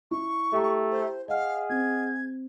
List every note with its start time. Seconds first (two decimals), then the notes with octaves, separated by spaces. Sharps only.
0.11 E4 C#6
0.53 A3 G4 G5 A#5
0.91 C5
1.28 G#4 D#5 F5 F#5 F6
1.69 C4 G#6